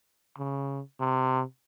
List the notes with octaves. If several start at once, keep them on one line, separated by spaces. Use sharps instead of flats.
C#3
C3